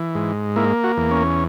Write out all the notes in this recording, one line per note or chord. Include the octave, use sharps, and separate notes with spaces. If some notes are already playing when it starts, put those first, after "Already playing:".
Already playing: E3
G#2
A#3 E4
F#4
E2
C#4